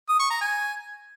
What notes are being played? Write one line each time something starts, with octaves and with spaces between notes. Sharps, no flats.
D#6
C#6
A#5
G#5